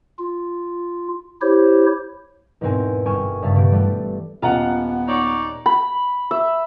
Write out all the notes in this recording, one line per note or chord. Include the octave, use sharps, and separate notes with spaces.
F4
E4 G4 C5 C#5
E2 G#2 B2 C4 A#4 G#5
G1 G5 G#5 C#6 F6 E7
G2 C#3 E5 F5 A6
B2 G4 D7
E3 G3 A3
D#1 B3 F4 D#5 F#5 A#5
D#4 C#5 D5
B5
E5